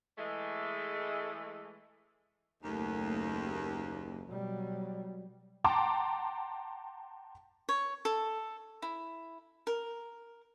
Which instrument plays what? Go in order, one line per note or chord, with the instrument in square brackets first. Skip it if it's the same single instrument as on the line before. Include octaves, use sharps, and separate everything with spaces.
[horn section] E3 G#3 A3
[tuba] F#1 [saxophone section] D#2 [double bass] A3
[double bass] B2 G3 [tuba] F#3
[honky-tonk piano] F#5 G5 A5 A#5 C6 D6
[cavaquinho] C#5
A4
E4
A#4